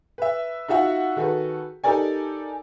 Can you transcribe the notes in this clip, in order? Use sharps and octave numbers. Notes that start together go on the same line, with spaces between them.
B4 E5
D#4 F4 F#4 E5 F#5
D#3 F#4 G#4 A4 B4
D#4 G4 A4 A#4 D5 G#5